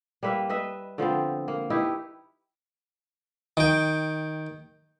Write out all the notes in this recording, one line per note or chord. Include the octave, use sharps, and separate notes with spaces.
G3 A#3 B4 E5
B4 D#5 E5
D3 F3 B3 C4
A#3
D#4 E4 G4 B4
D#3 G5